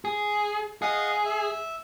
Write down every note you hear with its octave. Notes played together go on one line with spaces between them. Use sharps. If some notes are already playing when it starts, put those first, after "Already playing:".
G#4
G#4 D#5 F5 F#5
E5